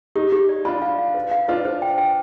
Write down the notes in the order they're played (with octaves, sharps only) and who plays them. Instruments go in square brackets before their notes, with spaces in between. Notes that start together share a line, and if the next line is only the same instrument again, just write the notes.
[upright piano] D#4 [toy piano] G4
[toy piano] G4
D5
[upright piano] D4 F4 [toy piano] B5
[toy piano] F5
F5
B4
F5
[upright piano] D4 F4 [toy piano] B4
[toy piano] C5
G5
G5